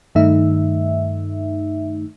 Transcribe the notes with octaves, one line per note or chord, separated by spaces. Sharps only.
G2 D#3 A3 D#4 E5